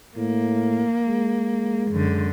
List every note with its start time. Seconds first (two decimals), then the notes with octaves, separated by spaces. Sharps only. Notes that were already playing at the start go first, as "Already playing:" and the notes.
0.16 A2 A#3
1.07 G#3
1.91 F#2 D3